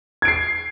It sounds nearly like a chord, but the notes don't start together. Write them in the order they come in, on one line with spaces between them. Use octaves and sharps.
G#6 D7 C7